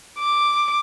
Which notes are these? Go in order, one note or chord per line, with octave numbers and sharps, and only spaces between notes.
D6